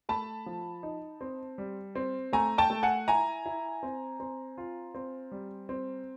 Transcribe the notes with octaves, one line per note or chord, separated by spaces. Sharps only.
A3 A5 B5
F3
D#4
C4
G3
C4
A3 G#5 A#5
G5 A5
A3
F#5 G#5
E4 G#5 A#5
E4
C4
C4
F4
C4
G3
C4